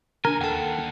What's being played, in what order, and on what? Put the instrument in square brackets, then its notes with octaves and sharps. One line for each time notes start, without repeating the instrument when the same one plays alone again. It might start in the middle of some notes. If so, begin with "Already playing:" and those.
[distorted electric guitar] C2 G#5 [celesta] D4 G7 [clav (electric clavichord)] A#4
[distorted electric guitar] D#2 [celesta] A4 G5 [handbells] F#5 A5